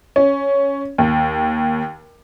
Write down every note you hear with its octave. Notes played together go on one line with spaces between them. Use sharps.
C#4
D#2